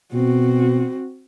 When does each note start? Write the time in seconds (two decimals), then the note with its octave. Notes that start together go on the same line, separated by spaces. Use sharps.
0.13 B2 C4 F#4